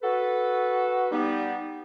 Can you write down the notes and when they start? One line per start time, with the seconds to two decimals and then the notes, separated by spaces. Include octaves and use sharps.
0.03 F#4 A4 B4
1.12 G3 B3 D#4